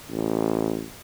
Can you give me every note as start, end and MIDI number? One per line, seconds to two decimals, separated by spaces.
0.11 0.85 33